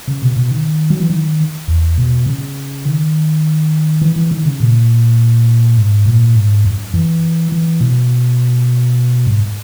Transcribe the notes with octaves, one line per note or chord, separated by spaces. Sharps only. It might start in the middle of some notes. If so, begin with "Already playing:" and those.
C#3
B2
B2
D#3
F#3
E3
D#3
E2
B2
C#3
D#3
E3
E3
D#3
C#3
A#2
G#2
A#2
G#2
F#2
E3
E3
B2
G#2